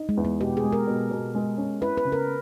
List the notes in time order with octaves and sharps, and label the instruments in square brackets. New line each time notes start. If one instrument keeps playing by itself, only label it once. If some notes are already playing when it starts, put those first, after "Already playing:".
Already playing: [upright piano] D#4
[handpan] G#3
[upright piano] E2
[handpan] B3
[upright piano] B2 [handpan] G4
[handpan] G#4
[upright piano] G#3
[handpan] A#4
[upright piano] B2
B2
G#3
C#4
[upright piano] E4 [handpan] B4
[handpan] B4
[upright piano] C#3
[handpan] A#4